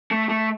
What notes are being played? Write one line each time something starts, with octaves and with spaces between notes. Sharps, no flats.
A3
A3